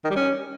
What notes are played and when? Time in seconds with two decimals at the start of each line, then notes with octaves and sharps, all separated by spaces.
0.04 D#3
0.10 G3
0.16 C#4